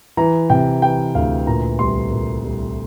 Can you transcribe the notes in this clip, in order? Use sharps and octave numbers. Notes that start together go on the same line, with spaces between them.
E3 A#5
C3 G5
E3 G5
D2 F5
A#2 A#5
C2 C6
A#2
C2